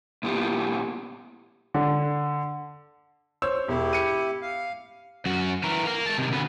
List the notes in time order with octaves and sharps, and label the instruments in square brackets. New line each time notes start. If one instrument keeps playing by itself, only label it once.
[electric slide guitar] A#2 B3 E4 G4
[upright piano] D3
[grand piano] C5 C#5 E6
[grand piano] E1 [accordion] E4 G4
[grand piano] C#7 D#7
[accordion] F5
[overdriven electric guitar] F#2 F#4
E3 A#4
A#3 A#4
G#3 A5
C3 D#3
D2 B3